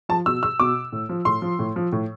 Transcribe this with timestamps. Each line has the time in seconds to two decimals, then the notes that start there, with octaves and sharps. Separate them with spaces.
0.09 F3 A5
0.26 B2 E6
0.43 E6
0.60 B2 D6
0.92 A2
1.09 F3
1.25 A2 C6
1.42 F3
1.59 A2
1.76 F3
1.92 A2